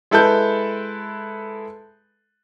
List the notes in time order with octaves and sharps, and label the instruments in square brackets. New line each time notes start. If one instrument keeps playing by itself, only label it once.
[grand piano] G#3 E4 A4 B4 A5 G6